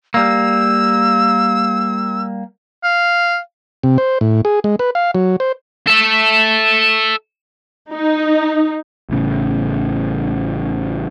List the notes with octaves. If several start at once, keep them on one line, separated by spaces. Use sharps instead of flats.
G3 A#3 E6
F5
C3
C5
A2
G#4
G#3
B4
F5
F#3
C5
A4 E5
D#4
A1 A2 C#3